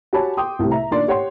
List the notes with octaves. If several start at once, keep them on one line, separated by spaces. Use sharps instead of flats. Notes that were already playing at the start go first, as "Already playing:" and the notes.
F#4 G4 C#5 G#5 A5 B5
G5 C6 D6 D#6
C2 A2 C3
E5 A#5
A#2 D#3 A#3 D4 D5 C6
G4 C#5 F#5 G5 C6